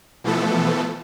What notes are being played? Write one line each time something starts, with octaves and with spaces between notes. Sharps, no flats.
B2 E3 F3 A3 B3 A4